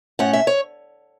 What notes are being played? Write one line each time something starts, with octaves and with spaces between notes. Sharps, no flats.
A2 A3 C#4 F#5
E5
C#5